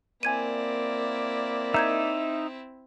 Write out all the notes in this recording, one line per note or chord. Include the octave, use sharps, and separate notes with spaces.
A#3 C4 E4 D5 G#5 G#6 D#7
D#4 E5 A#5 G6 G#6